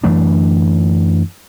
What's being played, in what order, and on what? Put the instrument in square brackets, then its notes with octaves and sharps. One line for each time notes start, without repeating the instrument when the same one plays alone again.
[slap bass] F#2 E3 A3 D4